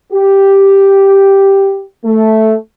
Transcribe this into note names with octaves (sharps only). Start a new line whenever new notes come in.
G4
A3